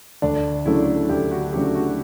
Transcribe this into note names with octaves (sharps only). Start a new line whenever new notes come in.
D2 D4
C#3 F#3 A3 D4 E4
D2 G4
F#4
C#3 F#3 A3 D4 G4
F#4